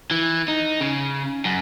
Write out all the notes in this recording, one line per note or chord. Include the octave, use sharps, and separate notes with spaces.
E3
D#4
C#3
F#2